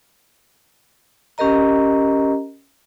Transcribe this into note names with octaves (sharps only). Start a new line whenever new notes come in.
C#4 G4 A#4 D#5 A#5